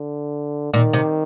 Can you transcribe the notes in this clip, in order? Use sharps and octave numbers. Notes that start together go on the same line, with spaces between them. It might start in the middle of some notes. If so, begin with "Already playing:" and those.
Already playing: D3
A#2 D#3
C3